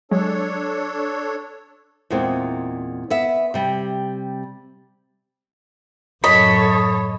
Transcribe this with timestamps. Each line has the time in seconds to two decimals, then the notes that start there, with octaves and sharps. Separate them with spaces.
0.11 F#3 G#3 D4 A4 C#5
2.10 E2 A#2 G#3 C4
3.10 B3 E5
3.54 C3 G3
6.24 F#2 A2 A4 C#5 D#5 B5